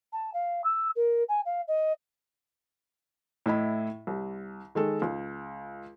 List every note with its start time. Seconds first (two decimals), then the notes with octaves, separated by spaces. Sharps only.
0.13 A5
0.34 F5
0.64 E6
0.96 A#4
1.29 G#5
1.45 F5
1.68 D#5
3.46 A2 E4 D#5 B5
4.07 C2
4.75 D#3 G#3 A4
5.02 C#2